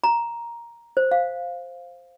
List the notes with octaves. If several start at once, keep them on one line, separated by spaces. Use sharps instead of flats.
A#5
C5
F5